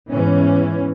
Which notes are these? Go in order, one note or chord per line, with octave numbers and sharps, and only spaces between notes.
E2 G#2 E3 C#4